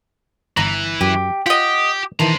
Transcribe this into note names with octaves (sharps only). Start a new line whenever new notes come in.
G1 E3 A#5
F#2 G4
F4 G4 D#5 F#5
D#3 E3 C5 A5 A#5